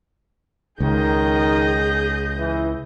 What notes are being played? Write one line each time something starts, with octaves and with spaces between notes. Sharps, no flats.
C#2 D#3 G#4 D#5 G6
E3